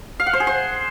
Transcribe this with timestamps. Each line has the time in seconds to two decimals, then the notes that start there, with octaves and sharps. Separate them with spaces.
0.20 F5
0.26 F#5
0.33 C5
0.40 G#4
0.47 C5